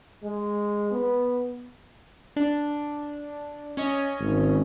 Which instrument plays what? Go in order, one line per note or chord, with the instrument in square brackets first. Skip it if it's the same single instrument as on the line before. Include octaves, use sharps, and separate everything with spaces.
[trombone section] G#3
B3
[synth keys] D4
C#4 C#5 D#5
[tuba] G#1